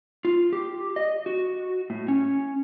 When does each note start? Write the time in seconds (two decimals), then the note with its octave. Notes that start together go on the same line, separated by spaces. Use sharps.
0.25 F4
0.53 G4
0.96 D#5
1.26 F#4
1.90 A2
2.08 C#4